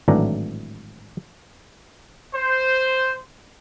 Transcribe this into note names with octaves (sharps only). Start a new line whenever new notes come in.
G#1 A2 E3 F#3 D4 A#5
C5